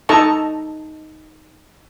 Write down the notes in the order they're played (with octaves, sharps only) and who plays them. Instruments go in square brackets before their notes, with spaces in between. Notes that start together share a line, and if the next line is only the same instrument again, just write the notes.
[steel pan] D#4 A4 D#5 A5 A#5 C#6